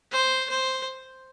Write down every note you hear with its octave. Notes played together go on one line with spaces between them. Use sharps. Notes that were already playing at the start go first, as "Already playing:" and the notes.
C5
C5